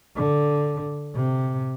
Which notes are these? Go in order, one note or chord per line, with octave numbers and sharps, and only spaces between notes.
D3
C3